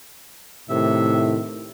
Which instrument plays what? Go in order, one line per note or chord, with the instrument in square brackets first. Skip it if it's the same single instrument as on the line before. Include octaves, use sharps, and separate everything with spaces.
[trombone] A2 [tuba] C3 [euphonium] D#3 [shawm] E5